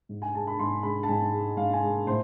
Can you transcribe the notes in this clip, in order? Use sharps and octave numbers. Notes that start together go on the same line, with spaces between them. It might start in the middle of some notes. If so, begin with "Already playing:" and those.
G#2
G#5
G#3 A5
B5
G#2 C6
G#3 B5
A5
G#2 G#5
G#3
G#2 F5
G#5
G#3
A2 C5